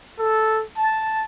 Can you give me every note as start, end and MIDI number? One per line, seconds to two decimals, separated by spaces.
0.18 0.62 69
0.76 1.24 81